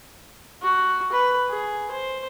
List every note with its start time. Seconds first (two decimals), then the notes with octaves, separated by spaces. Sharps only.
0.62 F#4
1.12 B4
1.49 G#4
1.91 C5